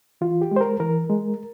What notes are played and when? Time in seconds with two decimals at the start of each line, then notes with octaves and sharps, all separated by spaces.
0.21 E3 F4
0.41 G4
0.51 G#3
0.56 C5
0.61 A#4
0.80 E3 A#4
1.09 G#3